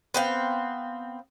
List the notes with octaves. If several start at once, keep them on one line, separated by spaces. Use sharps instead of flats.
B3 C4 F5